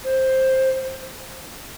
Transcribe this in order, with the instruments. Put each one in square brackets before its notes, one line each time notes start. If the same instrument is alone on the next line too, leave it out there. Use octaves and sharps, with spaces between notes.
[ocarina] C5